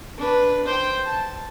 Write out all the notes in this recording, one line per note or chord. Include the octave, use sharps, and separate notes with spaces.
D4 B4
C5 G5
A5